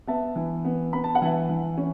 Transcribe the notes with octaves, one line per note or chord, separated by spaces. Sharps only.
B3 E5 A5
E3
B3
B3 B5
A5
F#5
E3 E5 A5
E3
C#4